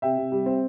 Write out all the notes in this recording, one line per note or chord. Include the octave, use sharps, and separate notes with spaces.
C3 E5 G5
C3
G3
C4